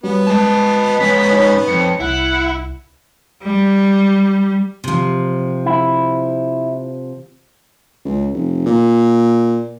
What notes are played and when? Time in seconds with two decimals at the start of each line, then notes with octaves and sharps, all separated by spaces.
0.03 G3 B3 C#4 F#4
0.27 G#3 D#5 A5
1.00 G#2 C#4 B6
1.30 D#4 C#5
1.68 F2 C#7
2.00 C2 E4 F#5
3.43 G3
4.84 C3 F3
5.66 E4
8.05 C#2
8.33 F1
8.66 A#2